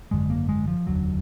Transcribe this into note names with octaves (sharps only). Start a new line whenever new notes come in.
G#1 F#2 D3 G#3
A#3
G#3
F3
F1 D#2 D3 F#3